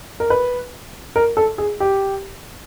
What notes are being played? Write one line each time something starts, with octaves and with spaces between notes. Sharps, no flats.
A#4
B4
A#4
A4
G#4
G4